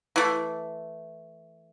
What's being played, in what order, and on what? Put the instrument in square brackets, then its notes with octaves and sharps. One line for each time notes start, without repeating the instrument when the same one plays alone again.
[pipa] E3 A3